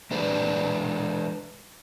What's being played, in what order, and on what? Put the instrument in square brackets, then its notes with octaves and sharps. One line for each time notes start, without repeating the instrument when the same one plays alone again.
[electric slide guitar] E3 G#3 D4 B4 C5 D5